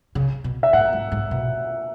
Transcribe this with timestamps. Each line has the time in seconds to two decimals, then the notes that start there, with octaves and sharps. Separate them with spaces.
0.15 C#3
0.44 B2
0.63 E5
0.73 A2 F#5
0.93 G#2
1.12 G#2
1.31 B2